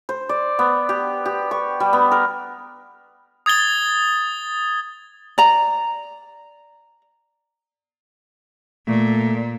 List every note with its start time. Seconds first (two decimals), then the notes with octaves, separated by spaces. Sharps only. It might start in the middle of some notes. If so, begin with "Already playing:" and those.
0.09 C5
0.29 D5
0.59 B3
0.89 G4
1.26 G4
1.51 C#6
1.80 G3
1.93 B3
2.11 A#4
3.46 D#6 G#6 A6 G7
5.38 D5 A#5
8.87 A#2 A3